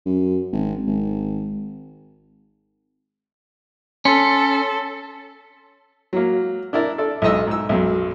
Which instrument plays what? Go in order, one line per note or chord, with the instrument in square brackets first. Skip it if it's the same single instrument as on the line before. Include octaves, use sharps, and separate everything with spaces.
[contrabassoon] F#2
G#1
G#1
[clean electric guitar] C#4 [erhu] A4 [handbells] C6 B6 C#7
[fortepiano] F#3 A#3
D4 E4 A#4 D5
A4 D5
B1 G#2 D#5 E6
G#2 E6
B1 F#2